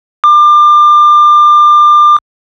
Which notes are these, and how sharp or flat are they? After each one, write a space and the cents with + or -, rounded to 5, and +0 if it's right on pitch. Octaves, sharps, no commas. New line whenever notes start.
D6 +30